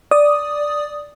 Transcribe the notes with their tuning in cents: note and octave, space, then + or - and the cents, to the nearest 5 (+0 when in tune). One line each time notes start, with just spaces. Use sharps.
D5 +0 D#6 +0